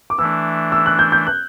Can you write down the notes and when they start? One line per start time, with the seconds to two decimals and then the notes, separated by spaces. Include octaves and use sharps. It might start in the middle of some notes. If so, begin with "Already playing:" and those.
0.10 D6
0.19 E3 A3 D4 E6
0.72 E6
0.86 F#6
0.99 G6
1.12 G6
1.27 F#6